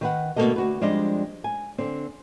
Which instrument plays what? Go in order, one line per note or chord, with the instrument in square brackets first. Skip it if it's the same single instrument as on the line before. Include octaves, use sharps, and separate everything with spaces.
[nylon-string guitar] D#3 B4 F#5
D2 B2 F#3 A#3 A4 D#5
D2 F#4 B4
F3 G3 G#3 C4 D4 D#5
G#5
D3 C4